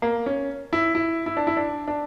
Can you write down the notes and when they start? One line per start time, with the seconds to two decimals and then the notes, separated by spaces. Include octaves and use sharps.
0.02 A#3
0.26 C#4
0.73 E4
0.95 E4
1.26 E4
1.37 D4
1.47 E4
1.57 D4
1.88 D4